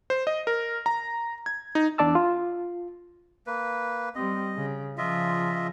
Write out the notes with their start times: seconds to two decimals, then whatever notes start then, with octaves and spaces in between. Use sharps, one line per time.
0.10 C5
0.27 D#5
0.47 A#4
0.86 A#5
1.46 G#6
1.75 D#4
1.98 E2 D4 D5 A5 E6
2.15 F4
3.47 A#3 B4
4.15 G3 C4 D#5
4.57 C#3
4.98 C#3 F3 F4 D#5 E5